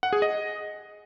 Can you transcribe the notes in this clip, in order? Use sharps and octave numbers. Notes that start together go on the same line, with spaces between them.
F#5
G#4
D#5